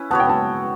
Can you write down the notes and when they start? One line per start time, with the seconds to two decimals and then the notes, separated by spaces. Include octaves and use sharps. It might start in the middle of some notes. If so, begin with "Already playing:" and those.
Already playing: C#4 E4 B4
0.11 B3 F#4 C#5 A5
0.20 G5
0.29 A5